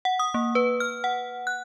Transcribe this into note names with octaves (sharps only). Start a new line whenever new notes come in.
F#5
D#6
A#3
B4
F6
F#5
F#6